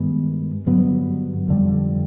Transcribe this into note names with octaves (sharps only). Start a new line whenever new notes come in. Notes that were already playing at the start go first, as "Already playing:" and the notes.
Already playing: G2 D#3 G#3 B3
G2 D3 F#3 B3
F2 D3 G3